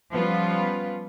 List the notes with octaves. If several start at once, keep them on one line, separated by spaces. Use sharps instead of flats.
F3 G3 B3 C#4 F4 B4